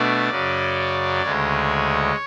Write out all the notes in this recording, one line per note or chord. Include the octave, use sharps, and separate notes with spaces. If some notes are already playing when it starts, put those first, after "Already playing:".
Already playing: B2 A3 D4 D5
F#2 C#3 F#3 C#4
D2 C#3 G#3 C#5